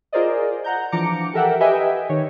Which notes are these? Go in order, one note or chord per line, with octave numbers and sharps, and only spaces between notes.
F4 G#4 A#4 C5 D5 D#5
F#5 A#5 G6
E3 F3 D4 A#5 D6 C#7
G4 A4 A#4 E5 F#5 G5
G4 B4 D#5 E5 G5 G#5
D#3 C#5